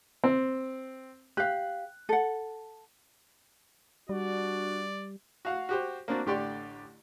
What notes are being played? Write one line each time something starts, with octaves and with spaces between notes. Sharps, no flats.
C4
G4 F5 F#6
A4 F#5
G3 D4 F#4 D5
F#4 F5 F#5
F#4 G4 C5
A#3 C4 D4 F#4
A1 D3 G4 D5 C6 C#6